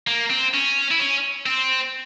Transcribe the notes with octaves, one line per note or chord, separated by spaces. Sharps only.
A#3
C4
C#4
E4
C#4
C4